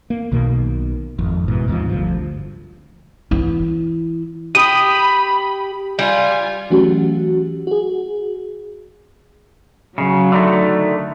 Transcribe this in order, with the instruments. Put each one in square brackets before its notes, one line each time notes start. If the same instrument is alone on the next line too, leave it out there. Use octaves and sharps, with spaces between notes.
[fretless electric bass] A#3
B1 B2 D#3 A#3
G#1 F2
G#2 B2 E3
D#2 G#2 C3 F3
G1 D2 G2 F3
[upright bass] E3 E4
[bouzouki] G4 [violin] B5 [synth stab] D#6
[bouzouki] G3 [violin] F4 G#5
[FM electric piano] E3 F#3 A3 C#4 F#4 G4
F#4 G#4
[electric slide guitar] C#3 [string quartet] F#3
[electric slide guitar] D3 D#3 A3